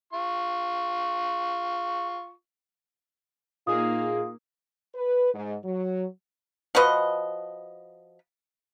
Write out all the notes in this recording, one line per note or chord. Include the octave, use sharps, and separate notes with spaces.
F4 C#6
A#2 A#3 D#4 F4 G#4 D#6
B4
G#2
F#3
F3 F#4 B4 D#5